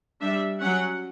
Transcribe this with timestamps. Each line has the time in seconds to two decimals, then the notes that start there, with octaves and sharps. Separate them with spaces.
0.21 G3 D4 E5
0.61 F#3 C#4 F#5